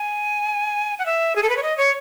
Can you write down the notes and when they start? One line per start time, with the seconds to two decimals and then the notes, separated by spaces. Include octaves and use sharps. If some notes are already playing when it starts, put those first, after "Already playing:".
Already playing: G#5
0.99 F#5
1.06 E5
1.36 G#4
1.43 A4
1.50 B4
1.57 C#5
1.63 D#5
1.78 C#5